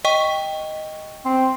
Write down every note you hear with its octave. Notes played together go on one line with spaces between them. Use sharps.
D#5 G5 C#6
C4